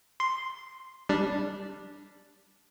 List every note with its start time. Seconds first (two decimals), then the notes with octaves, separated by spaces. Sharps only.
0.20 C6
1.09 G3 D4